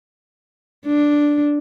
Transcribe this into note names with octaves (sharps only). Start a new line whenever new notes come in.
D4